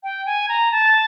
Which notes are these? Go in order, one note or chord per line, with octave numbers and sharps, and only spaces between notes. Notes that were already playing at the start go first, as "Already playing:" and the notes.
G5
G#5
A#5
A5